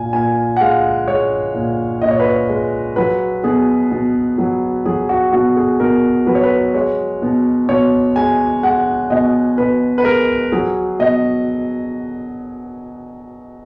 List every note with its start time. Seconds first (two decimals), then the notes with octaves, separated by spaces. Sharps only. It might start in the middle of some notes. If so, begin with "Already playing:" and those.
Already playing: A#2 G#5
0.13 A#2 G#5
0.57 F#5
0.61 G#3 F5
1.08 G#3 C#5
1.55 A#2
2.02 A#2 D#5
2.11 C#5
2.20 B4
2.28 C#5
2.49 G#3
2.96 F#3 B4
3.43 B2 G#4
3.91 B2
4.38 F#3
4.85 F#3 G#4
5.09 F#4
5.32 B2 F#4
5.56 G#4
5.80 B2 A#4
6.27 F#3 B4
6.35 C#5
6.43 B4
6.74 G#3 C#5
7.22 B2
7.69 B2 C#5
8.16 G#3 G#5
8.63 G#3 F#5
9.10 B2 D#5
9.58 B2 B4
9.98 B4
10.05 G#3 A#4
10.52 F#3 G#4
10.99 B2 D#5